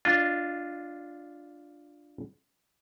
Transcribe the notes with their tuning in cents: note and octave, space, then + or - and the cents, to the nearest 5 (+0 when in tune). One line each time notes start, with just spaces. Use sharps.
D4 +0 F4 +0 D#5 -25